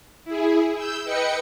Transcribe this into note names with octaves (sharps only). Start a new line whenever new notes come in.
E4 G#4
E6 G6
B4 D#5 G5 C#7